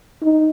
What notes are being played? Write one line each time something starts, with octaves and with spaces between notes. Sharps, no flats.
D#4